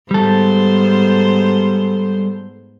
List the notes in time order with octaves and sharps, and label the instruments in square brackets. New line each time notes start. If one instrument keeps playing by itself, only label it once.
[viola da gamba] G#2 B3 C5 [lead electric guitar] G3 A4